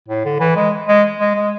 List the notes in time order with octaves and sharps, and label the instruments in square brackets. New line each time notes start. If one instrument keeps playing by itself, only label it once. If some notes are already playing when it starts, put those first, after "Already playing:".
[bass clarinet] A2
D3
E3
G#3
G#3
G#3
G#3